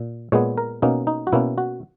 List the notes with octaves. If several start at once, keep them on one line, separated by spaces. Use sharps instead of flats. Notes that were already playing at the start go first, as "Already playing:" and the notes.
Already playing: A#2
A#2 G#3 B3 C#5
A#4
B2 A#3 C#4 D#4
D#4
F#4
B2 A#3 C#4 E4
F#4